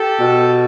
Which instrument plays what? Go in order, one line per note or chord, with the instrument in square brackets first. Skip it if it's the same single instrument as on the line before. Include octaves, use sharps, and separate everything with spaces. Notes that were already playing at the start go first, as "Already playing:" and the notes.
Already playing: [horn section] G4 A4
[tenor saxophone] B2